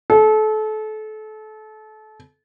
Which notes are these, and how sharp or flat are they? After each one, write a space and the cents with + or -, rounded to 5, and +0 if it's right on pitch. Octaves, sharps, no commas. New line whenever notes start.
A4 -30